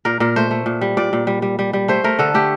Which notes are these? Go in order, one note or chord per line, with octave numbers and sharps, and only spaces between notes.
A#2 A#4
A#2 A#4
A3 C5
A3
A#2
G3
A#2 D5
A#2
G3
G3
G3
G3
A3 C5
A3 A#4
D3 A4
A3 G4